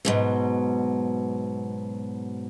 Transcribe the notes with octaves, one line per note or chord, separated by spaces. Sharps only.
G#2 B2 F#3